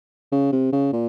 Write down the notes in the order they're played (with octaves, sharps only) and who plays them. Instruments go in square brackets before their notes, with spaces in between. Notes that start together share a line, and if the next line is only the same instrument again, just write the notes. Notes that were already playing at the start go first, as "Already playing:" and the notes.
[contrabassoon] C#3
C3
C#3
A#2